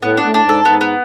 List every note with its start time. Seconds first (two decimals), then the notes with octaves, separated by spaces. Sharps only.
0.02 A2 B3
0.17 D4
0.22 A2
0.34 D4
0.44 G#2
0.49 A4
0.65 G#2 B3
0.81 B3